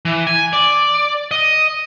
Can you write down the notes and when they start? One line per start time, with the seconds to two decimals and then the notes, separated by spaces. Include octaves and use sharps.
0.05 E3
0.27 G#5
0.53 D5
1.31 D#5